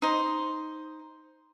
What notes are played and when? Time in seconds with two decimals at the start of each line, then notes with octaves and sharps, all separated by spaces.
0.02 D#4 C5